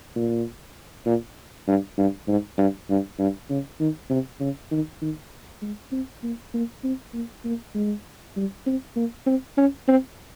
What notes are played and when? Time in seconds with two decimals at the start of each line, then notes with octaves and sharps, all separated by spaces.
0.15 A#2
1.06 A#2
1.68 G2
1.97 G2
2.28 G#2
2.58 G2
2.89 G2
3.19 G2
3.49 C#3
3.80 D#3
4.10 C3
4.40 C#3
4.71 D#3
5.02 D#3
5.62 G#3
5.92 C4
6.23 A#3
6.54 A#3
6.84 C4
7.14 A#3
7.45 A#3
7.74 G#3
8.36 G3
8.66 C4
8.96 A#3
9.26 C4
9.57 C#4
9.88 C4